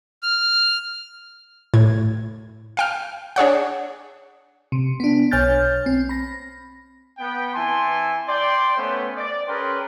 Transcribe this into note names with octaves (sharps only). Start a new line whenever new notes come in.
F6
A2 G#6
F5 G5 F6
D4 G#4 C#5 F#5
C3
B3 D4
B1 C#5 G#5 F6 G6 A6
C4
B5 A#6
B3 G5
E3 C4 E4 G#5 A5 C6
D5 G5 C6
A3 B3 C#4 B4 C5
D5
C#4 G#4 A#4 B4 G5 C6